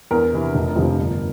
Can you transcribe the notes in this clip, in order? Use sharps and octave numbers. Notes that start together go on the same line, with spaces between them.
E2 A#4
C3 E3
F1
F2 C3 F3
G1